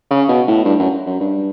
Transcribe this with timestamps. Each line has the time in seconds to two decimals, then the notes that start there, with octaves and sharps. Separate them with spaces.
0.11 C#3
0.28 B2
0.48 A2
0.65 G2
0.79 F#2
1.06 F#2
1.20 G2